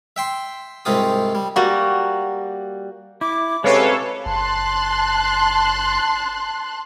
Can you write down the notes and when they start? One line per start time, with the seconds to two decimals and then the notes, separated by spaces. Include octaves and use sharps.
0.16 E5 G5 C6
0.85 C2 G#2 C4 F4 G4 D#6
1.35 G3
1.56 G3 A#3 F#4
3.21 E4 D6
3.64 C3 G#3 C#4 G4 A4 B4 C#5 F5
4.26 F#1 A5 C6 F#6